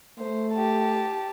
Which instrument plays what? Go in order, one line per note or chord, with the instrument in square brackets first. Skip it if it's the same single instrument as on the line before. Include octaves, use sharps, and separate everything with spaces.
[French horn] A3 [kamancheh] C5
[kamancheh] G4 A5